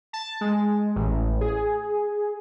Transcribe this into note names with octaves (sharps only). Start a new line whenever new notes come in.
A5
G#3
A1
G#4